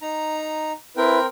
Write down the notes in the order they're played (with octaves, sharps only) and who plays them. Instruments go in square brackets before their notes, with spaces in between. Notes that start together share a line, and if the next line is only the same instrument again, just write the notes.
[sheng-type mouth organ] D#4 A#5
[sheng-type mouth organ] C4 A#4 G5 [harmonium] E4 B4